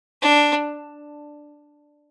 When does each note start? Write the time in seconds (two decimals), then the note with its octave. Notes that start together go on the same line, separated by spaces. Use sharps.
0.22 D4